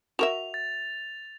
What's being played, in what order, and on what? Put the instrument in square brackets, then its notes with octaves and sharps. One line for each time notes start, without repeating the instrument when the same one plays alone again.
[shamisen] F#4 A#4 E5 [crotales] F7
[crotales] A6